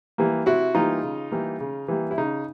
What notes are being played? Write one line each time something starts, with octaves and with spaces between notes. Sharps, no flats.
E3 G3 A#3
C3 E4 F#4
E3 G3 A#3 D#4 F4
C#3
E3 G3 A#3
C#3
E3 G3 A#3
E4
C#3 D#4